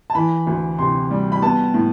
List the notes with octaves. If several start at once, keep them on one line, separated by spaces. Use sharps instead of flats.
A5
E3 B5
D2
C3 C6
G3
B5
B3 A5
A2